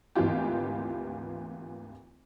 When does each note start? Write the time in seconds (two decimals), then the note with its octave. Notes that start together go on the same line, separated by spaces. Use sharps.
0.15 G#1 D2 E3 B3 F4 G4